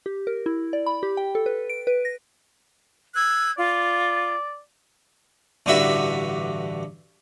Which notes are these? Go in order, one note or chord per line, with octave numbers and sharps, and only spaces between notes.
G4
A#4
E4
D5
B5
G4
G5
A4
B4
D7
B4
A#6
E6 F#6 G#6
F4 D5
A1 G2 D3 F#4 E5 B5